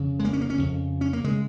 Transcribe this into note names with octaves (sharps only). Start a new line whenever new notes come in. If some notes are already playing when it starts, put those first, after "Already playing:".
Already playing: F2 C#3
G#3
A#3
C#4
A#3
C#4
F2 C#3
C#4
A#3
C#3 G#3